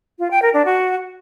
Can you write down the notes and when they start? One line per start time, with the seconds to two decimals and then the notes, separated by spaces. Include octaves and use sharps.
0.19 F4
0.31 G5
0.42 A#4
0.54 D4
0.65 F#4